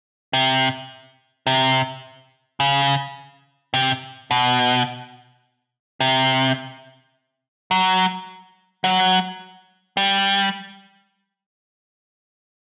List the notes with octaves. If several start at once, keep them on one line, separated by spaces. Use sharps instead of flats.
C3
C3
C#3
C3
B2
C3
F#3
F#3
G3